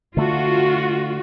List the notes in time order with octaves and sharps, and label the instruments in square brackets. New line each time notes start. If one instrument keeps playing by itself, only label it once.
[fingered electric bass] D3 A3 [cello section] F4 F#4